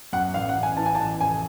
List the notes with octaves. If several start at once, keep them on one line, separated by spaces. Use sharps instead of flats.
F#2 F#5
A1 F5
F#5
A1
G#5
E3 A5
G#5
A5
A1
F1 G#5